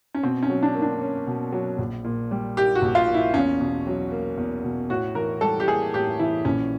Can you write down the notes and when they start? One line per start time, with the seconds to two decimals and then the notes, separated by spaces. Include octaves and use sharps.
0.14 C#4
0.23 B2 C4
0.43 C#4
0.50 F#3
0.63 D4
0.75 A#3
0.82 D4
1.02 C#4
1.27 B2
1.52 F#3
1.78 A#1
2.04 A#2
2.31 G3
2.57 A#3 G4
2.75 F#4
2.82 A#1
2.95 F4
3.08 A#2
3.14 E4
3.34 E2 C#4
3.61 B2
3.87 F#3
4.11 A#3
4.37 E2
4.64 B2
4.90 A2 F#4
5.15 E3 A#4
5.41 G3 A4
5.60 G4
5.68 A#3 G#4
5.93 A2 G4
6.19 E3 E4
6.45 A#1 C#4